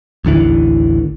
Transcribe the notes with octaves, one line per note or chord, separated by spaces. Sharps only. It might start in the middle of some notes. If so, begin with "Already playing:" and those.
A1 D#2 D3 E3